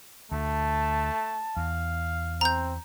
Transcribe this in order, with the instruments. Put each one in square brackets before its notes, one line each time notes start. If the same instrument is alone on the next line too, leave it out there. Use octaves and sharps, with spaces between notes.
[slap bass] D2 [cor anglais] A3 [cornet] A5
[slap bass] E2 [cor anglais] F5
[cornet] C4 [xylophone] A#5 G6